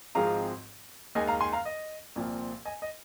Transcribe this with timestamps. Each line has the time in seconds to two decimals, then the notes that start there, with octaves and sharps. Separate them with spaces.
0.15 G#1 G#2 F3 G#3 C4 F5 A#5
1.15 D#2 D#3 G#3 D#5 G#5
1.27 F5 A#5
1.40 G#5 C6
1.53 F5 A#5
1.65 D#5
2.16 C2 A#2 F3 C4
2.65 D#5 G#5
2.82 D#5